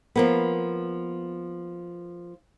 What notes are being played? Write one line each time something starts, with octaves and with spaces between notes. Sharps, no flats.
F3 A#3 B3